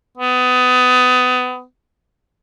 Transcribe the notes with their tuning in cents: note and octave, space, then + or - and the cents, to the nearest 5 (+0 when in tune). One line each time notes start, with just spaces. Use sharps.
B3 +25